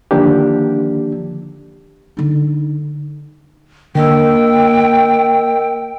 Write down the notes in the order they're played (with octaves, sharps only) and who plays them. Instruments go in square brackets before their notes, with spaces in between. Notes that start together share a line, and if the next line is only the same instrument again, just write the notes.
[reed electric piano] D3 D#3 F3 A#3 D4 G4
[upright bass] D3 D#4
[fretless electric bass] D3 [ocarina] A#3 [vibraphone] A#4 D#5 E6 [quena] G5